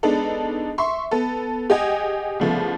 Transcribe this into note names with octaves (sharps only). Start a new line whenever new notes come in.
G#3 B3 D4 D#4 A4
E5 C6 C#6
B3 A4
G4 G#4 D#5 F#5 G#5
C2 C#3 F3 A3 B3